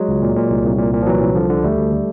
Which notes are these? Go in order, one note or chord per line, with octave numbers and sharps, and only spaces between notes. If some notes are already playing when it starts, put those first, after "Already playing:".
Already playing: F#3 G#3
C#2
A#2
A#2
C2
C2
A#2
A#2
F3
C2 E3 F#3
C2
D3 F3
D3
D2 G3 A3
D2
D3